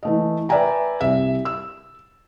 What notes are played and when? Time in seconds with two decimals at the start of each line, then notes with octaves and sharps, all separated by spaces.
0.03 E3 A3 D#5
0.49 B4 D5 E5 G5 G#5 A#5
1.01 C2 E5
1.45 E6